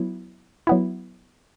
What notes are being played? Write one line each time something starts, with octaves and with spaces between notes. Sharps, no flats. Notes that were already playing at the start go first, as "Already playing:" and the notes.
Already playing: F#3 B3 E4
F#3 B3 E4